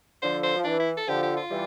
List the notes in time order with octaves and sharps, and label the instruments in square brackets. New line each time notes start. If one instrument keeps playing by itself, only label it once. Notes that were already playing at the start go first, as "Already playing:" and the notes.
[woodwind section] D3 F3 [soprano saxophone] C5
[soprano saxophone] C5
[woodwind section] F3
[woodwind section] E3 [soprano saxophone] D4
[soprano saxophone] E4
A4
[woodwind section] D3 F3 [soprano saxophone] G4
[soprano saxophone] G4
F4
[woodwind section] E3 G3